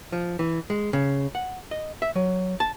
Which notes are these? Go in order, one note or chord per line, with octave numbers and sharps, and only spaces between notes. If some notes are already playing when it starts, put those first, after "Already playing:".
F3
E3
G#3
C#3
F#5
D#5
E5
F#3
A5